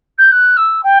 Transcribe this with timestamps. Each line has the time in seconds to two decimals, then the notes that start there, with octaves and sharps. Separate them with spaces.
0.18 G6
0.31 F#6
0.56 E6
0.83 G5